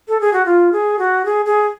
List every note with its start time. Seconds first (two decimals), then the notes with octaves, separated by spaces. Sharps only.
0.08 A4
0.21 G#4
0.33 F#4
0.46 F4
0.73 G#4
0.99 F#4
1.25 G#4
1.46 G#4